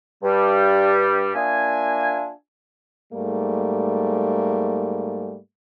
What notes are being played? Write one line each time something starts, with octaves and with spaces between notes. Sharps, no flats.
G2 G3
A#3 D4 F4 E5 G#5
G#2 G3 A3 A#3